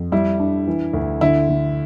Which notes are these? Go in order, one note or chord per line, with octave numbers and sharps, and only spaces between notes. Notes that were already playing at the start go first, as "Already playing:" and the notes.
Already playing: F2
G3 E4
D4
E3
D2
D3 E4
D3